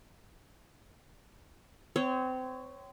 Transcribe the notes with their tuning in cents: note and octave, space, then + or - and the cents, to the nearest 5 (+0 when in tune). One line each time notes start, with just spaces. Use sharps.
C4 -25 C#5 +0